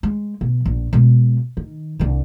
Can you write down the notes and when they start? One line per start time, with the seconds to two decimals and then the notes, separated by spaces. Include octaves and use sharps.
0.03 G#3
0.41 B2
0.66 A#1
0.93 B2 G#3
1.57 D#3
1.99 C2 D3